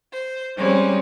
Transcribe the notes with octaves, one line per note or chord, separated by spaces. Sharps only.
C5
G3 G#3 C4 C#4